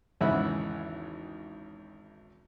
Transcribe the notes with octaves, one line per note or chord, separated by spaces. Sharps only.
G#1 E2 C#3 E5 F#5 B5